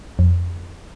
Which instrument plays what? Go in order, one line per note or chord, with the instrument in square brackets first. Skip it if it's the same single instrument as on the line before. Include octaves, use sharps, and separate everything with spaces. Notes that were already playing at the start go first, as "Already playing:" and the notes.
[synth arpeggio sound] F2